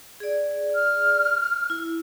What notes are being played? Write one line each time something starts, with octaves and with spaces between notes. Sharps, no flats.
G#4 D5
F6
E4